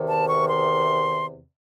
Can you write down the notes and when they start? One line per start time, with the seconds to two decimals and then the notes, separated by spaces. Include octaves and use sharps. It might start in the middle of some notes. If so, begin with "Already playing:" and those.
Already playing: E2 C3 D#3
0.08 A5
0.28 C#6
0.48 C6